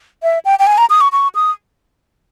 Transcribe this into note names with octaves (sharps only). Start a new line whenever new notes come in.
E5
G5
G5
G#5
A#5
D#6
C#6
C#6
D#6